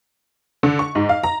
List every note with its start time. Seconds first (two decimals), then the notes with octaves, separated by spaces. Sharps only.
0.63 D3
0.79 C#6
0.95 G#2
1.09 F5
1.23 A#5